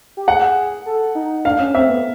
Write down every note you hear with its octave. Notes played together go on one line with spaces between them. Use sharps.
G4
G#4 F#5
A4
D#4
D4 F5
C#4
C4 E5
B3